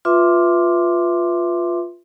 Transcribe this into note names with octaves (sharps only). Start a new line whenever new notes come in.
F4 B4 E5 C6 D6